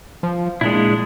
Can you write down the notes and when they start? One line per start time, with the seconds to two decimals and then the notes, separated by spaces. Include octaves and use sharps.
0.23 F3
0.61 A#2 G#3 D4 E4